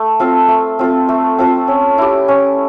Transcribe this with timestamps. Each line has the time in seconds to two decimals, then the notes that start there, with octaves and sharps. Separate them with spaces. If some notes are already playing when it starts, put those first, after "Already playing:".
Already playing: A3
0.20 C4 F4 A4
0.48 A3
0.79 C4 F4 A4
1.09 A3
1.39 C4 F4 A4
1.68 C#4
1.98 E4 G4
2.28 C#4